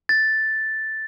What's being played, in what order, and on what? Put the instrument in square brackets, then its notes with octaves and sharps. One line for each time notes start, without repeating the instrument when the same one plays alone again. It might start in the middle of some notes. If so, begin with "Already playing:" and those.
[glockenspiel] A6